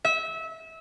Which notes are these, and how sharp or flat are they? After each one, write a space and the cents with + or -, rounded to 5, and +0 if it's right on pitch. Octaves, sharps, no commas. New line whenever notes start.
E5 -25